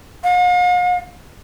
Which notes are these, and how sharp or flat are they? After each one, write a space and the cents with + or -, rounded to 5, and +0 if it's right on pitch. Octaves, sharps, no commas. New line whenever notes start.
F5 +45